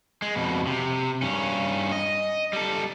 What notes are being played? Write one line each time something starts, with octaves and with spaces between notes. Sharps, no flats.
G#3
F2 B2
C3
G2 C#4
D#5
G3 A4